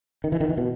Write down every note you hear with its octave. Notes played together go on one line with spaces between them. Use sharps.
D#3
E3
D#3
E3
B2